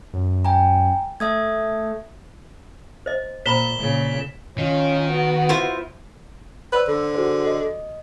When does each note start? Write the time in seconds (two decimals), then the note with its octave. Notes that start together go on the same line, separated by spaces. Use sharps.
0.14 F#2
0.45 G5 G#5 A#5
1.20 A3 E5 D#6 G#6
3.06 C5 D#5
3.46 A#2 C5 A#5 B5 B6 E7 G7
3.79 A#2 C#3
4.58 D#3 C#4 F4
5.10 B3 F#4
5.49 E4 F4 C5
6.73 B4 C5 D5 E6
6.88 D3
7.14 F#4 G#4 C5
7.47 D#5